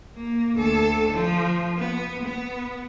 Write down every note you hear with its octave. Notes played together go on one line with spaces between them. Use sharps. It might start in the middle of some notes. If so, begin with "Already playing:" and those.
A#3
D2 A4
F3
B3
B3